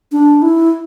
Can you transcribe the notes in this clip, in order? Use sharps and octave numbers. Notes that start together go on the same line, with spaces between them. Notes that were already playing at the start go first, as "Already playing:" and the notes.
D4
E4